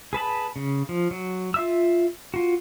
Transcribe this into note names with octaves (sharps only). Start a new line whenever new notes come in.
G#4 B4 A5 B5
C#3
F3
F#3
F4 E5 E6
F4 F#4